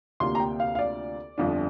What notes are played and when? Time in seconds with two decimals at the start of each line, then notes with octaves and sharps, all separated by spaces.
0.20 D2 C3 A#3 F4 C6
0.35 A#5
0.40 G5
0.60 F5
0.75 F5
0.79 D5
1.38 G1 F2 F3 D4